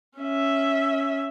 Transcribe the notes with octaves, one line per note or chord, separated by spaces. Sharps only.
C#4 E5